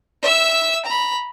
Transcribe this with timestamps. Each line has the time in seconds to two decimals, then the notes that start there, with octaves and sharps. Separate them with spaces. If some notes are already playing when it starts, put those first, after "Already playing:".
0.23 E5 E6
0.85 A#5 B5